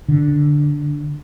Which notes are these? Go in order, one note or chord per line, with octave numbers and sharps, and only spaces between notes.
D3